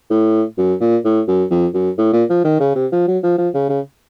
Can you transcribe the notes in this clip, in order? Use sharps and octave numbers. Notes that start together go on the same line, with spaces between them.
A2
F#2
A#2
A2
F#2
F2
F#2
A2
A#2
F3
D#3
C#3
C3
F3
F#3
F3
F3
C#3
C#3